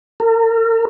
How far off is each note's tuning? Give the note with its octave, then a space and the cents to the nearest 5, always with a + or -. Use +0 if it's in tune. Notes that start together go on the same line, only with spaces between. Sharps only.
A#4 -40